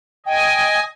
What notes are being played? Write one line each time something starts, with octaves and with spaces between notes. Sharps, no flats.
D#5 G5 G#5